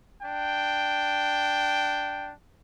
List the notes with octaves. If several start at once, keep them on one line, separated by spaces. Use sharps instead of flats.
D4 G5